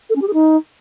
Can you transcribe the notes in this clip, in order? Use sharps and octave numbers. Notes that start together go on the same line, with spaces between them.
A4
C#4
G4
G#4
D#4